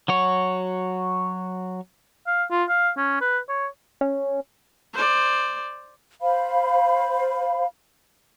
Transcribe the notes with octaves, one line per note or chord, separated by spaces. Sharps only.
F#3 F#4 C#5
F5
F4
F5
C#4
B4
C#5
C#4
C5 D5
C5 F5 B5